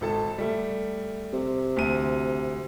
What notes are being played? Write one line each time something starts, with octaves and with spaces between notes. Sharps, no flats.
G#1 A4 A5
G3 A3
C3
D2 D#7